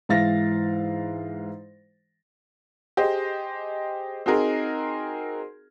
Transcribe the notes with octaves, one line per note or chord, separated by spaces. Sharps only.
G#2 E3 F5 A6 A#6
G4 G#4 C5 D#5
C4 D#4 F#4 G#4 A#4